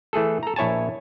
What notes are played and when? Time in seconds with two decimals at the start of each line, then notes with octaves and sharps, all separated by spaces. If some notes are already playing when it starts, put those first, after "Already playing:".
0.13 E3 A3 G#4 A4
0.43 A4 A#5
0.56 A#1 E4 C#5 G#5 A5